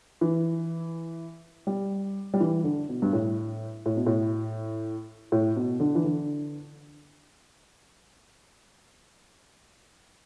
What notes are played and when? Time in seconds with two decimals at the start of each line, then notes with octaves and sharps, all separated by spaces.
0.21 E3
1.67 G3
2.34 G3
2.40 E3
2.64 D3
2.89 B2
3.02 G2
3.13 A2
3.86 A2
3.97 B2
4.07 A2
5.32 A2
5.56 B2
5.80 D3
5.95 E3
6.04 D3